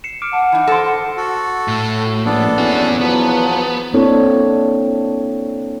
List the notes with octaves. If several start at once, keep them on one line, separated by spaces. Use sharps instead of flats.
C7 C#7 E7
D6 F6 D7
F#5 A5 D6
E3 D#4
A4 C5 A#6 C#7 D7
F#5
F#4 A4
A2
A#1 B3 D4 A4
E2 C#4 F#4
F3 F#3 B3
A#3 C4 D4 E4 A4 C#5